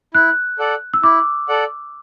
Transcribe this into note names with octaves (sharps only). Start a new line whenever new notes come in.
E4 F#6
A4 D5 F#5
E6
E4 D6
A4 D5 F#5